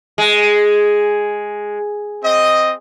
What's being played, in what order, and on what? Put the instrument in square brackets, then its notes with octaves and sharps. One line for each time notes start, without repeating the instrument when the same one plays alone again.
[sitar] G#3
[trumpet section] C4 D#5